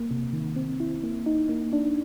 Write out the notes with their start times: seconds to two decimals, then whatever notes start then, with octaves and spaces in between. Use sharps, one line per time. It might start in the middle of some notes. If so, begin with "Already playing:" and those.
Already playing: A#3
0.11 C3
0.33 D#3
0.56 C4
0.80 E4
1.04 A#3
1.26 D#4
1.49 A#3
1.73 D4